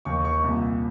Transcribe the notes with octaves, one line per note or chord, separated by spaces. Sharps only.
D#2 D#3 C#6
C#6
C2 A#2